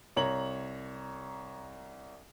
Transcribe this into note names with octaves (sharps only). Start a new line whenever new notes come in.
C2 C#5 A#5 F#7